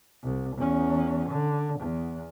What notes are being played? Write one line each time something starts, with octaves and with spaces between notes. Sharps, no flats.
C2
E2 C#4
D3
E2